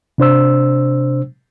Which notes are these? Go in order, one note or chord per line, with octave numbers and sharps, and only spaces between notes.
C3 D4 C5 E6